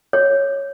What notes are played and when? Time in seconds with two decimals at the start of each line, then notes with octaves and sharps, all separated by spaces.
0.13 C#5